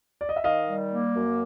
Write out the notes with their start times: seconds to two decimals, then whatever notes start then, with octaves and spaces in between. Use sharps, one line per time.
0.21 D5
0.29 D#5
0.36 E5
0.44 D#3 D#5 F5
0.68 G3
0.91 A#3
1.15 F#2